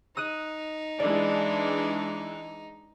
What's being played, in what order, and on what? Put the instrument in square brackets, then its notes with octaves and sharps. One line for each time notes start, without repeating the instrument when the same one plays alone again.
[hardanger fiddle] D#4 [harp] D#6 F#6 D#7
[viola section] E3 G#3 D4 [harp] D5